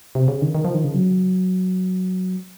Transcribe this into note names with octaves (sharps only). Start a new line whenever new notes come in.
C3
C#3
D#3
D#3
F3
D#3
C#3
F#3